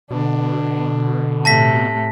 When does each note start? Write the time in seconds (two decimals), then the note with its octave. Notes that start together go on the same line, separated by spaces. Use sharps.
0.11 B2 D3 D4
1.45 A2 C3 A3 A5 A#6 B6